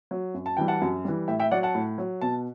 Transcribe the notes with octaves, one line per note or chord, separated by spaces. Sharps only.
F#3
F#2
A5
E3 G3 G5
F#5 A5
F#2
E3 G3
A2 E5 G5
E5 G5
F#3 D5 F#5
F#5 A5
A2
F#3
B2 A5